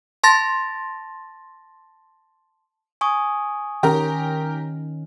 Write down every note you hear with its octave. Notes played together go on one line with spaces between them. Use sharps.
A5 C6 A6 A#6
G#5 C#6 D#6
D#3 C#4 G4 A#4 A#5